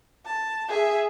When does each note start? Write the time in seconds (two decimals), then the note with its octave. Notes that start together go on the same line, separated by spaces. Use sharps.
0.25 A5
0.69 G#4 E5